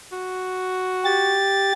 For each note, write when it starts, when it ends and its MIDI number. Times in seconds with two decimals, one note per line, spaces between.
0.12 1.38 66
1.05 1.73 67
1.05 1.73 93